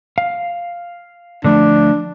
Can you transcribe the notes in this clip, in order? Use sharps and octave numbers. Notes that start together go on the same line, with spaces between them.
F5
D3 F3 A3 D4